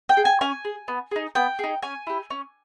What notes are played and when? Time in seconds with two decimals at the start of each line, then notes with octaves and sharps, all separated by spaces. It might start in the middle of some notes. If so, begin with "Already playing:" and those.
0.09 G5
0.17 G#4
0.25 G#5
0.41 C#4 G#5
0.65 G#4
0.88 B3
1.11 D#4 G#4
1.35 B3 G5
1.59 D#4 G#4
1.83 C#4 G#5
2.07 E4 G4
2.30 C#4